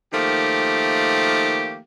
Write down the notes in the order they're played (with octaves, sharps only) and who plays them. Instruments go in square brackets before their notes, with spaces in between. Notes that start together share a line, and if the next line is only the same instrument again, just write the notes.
[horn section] D#3 F3 A3 A#3 G4